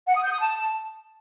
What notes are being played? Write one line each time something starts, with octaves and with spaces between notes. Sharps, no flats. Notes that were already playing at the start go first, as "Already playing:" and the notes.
F#5
D#6
G6
D#6
A5